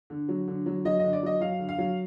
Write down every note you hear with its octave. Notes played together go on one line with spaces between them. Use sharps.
D3
F#3
D3
F#3
F#3 D#5
D3 D#5
D5
F#3 D#5
F#3 F5
D3
F5
F#3